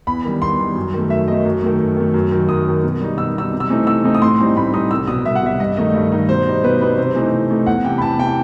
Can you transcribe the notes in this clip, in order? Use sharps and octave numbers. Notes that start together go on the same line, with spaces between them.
E2 B5
D#3 G3
E2 C6
D#3 G3
F#2
D#3 A3
F#2 E5
D#3 A3 D#5
F#2
D#3 A3
F#2
D#3 A3
F#2
D#3 F#3
F#2 D#6
D#3 F#3
B2
G3 D#4
B2 E6
G3 D#4 E6
C3
E6
E3 A3 C4 D#4
C3 E6
E3 A3 C4 D#4
D#6
A2 C6
E3 G3 C4 D#4
A2 B5
E3 G3 C4 D#4 D#6
C2 E6
B2 D#6
G3
C2 E5
F#5
B2 G3 E5
G2 D#5
D#3 A3 D#4 D#5
G2
D#3 A3 D#4
B2 C5
G3 D#4
B2 B4
G3 D#4 B4
C3 C5
E3 A3 D#4
C3
E3 A3 D#4
E2 F#5
C3 E3 G5
B5
E2 A5
C3 E3 G5